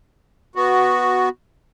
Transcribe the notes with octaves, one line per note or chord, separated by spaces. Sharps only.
B3 F#4